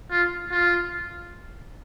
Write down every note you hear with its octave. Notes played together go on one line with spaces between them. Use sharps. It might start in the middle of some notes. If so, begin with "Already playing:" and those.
F4
F4